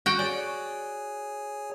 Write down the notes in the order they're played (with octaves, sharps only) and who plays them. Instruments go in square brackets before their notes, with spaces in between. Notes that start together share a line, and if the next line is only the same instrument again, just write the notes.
[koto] F#4 G5
[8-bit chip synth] G#4 C#5 G#5 [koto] D5